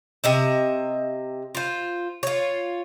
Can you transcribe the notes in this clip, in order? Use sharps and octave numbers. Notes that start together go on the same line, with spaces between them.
C3 D#5 E5
F4 C5
F4 C#5